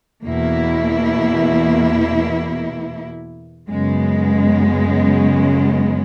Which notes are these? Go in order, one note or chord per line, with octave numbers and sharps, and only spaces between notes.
E2 B2 A#3 E4
F#2 C#3 G#3 B3